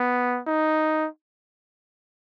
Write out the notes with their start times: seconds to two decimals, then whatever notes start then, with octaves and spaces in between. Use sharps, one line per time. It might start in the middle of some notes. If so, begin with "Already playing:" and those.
Already playing: B3
0.47 D#4